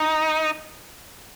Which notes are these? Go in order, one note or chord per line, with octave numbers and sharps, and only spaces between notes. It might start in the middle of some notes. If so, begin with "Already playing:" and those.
Already playing: D#4